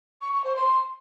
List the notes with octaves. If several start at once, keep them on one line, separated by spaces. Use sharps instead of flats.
C#6
C#6
C5
C6